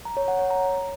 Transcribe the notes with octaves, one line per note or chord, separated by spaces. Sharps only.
A#5
C#5
F#5
C#5
A#5